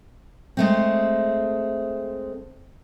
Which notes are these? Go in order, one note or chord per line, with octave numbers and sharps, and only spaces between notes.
G#3 A3 C4